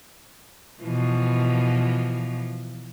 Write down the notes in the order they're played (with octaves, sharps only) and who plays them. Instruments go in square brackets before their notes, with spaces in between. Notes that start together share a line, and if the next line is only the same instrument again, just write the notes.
[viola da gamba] B2 E3 F3